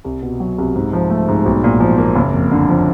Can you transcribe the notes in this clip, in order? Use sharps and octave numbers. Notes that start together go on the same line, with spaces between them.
C2
B2
F#3
C2
G#2
F3
A3
G#2
B1
A#2
F3
A#3
F#1
F2
D3
F3